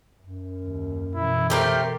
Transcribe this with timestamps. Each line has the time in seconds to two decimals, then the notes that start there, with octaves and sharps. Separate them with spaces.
0.21 F#2
0.65 D#2
1.15 B2 E3 E4
1.50 A3 C4 G4 A#4